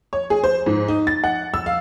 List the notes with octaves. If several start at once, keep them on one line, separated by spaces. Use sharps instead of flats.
C#5
G#4
C5
G#2
D#4
A6
F#5
E6
F5